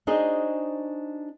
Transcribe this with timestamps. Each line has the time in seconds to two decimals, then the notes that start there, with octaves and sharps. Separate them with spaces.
0.07 D4 D#4 F#4 G#4 C5 D#5